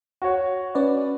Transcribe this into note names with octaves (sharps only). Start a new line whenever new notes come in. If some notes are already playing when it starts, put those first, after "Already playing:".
F#4 C#5
C#4 B4 D5